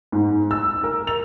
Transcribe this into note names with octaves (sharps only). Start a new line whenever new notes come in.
G#2
E6
A#4
F7